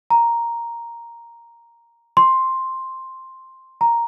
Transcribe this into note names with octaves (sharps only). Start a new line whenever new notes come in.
A#5
C6
A#5